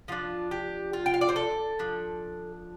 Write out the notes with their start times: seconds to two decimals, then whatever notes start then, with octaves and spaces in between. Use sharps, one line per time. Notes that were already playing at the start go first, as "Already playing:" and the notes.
0.08 F3 D4 F4
0.51 G4
0.93 F4
1.06 G5
1.14 F5
1.21 D5
1.29 C5
1.36 A4
1.79 F3 D4